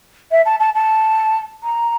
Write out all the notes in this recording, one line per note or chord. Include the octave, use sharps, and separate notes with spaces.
E5
A5
A5
A5
A#5